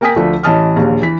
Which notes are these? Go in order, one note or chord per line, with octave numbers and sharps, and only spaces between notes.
A#3 A#4 G5 G#5 D#6 B6
D2 F3 A3 D4
A1 E3 D#5 A5 D#6 F6
A#1 D#2
E3 B6